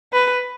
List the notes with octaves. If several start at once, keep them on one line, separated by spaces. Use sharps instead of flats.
B4